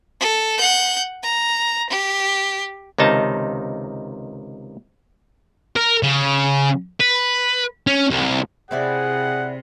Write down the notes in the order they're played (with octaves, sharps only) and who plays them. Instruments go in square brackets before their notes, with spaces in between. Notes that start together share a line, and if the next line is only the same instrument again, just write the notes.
[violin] A4
F#5 G6
A#5
G4
[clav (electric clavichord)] C#2 C3 D#3 D#4 A5
[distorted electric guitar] A#4
C#3
B4
C#4
C2
[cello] C3 [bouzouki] C4 E4 D5 [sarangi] G#4 [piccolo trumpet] F#5